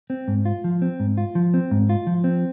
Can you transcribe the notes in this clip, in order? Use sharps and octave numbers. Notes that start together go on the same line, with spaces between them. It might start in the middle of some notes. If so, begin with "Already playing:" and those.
C4
G#2
F4
F3
C4
G#2
F4
F3
C4
G#2
F4
F3
C4